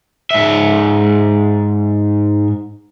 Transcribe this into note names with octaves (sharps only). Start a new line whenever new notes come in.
G#2 E5